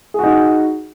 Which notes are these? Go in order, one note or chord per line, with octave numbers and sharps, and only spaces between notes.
D#4 F#4 G#4